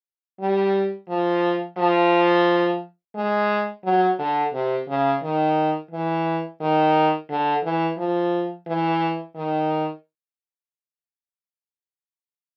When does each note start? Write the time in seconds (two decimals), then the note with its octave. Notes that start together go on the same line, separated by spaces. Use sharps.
0.40 G3
1.09 F3
1.78 F3
3.16 G#3
3.84 F#3
4.19 D3
4.53 C3
4.88 C#3
5.23 D#3
5.91 E3
6.61 D#3
7.30 D3
7.64 E3
7.98 F3
8.67 E3
9.36 D#3